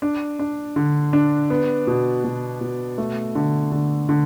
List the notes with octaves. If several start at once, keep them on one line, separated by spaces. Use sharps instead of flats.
D4
D4
D3
D4
B3
B2
B2
B2
A3
D3
D3
D3